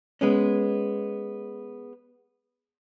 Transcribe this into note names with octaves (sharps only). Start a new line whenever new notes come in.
G#3 B3 C#4